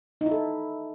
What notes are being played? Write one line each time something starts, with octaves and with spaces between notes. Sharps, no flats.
D#4
E4
A4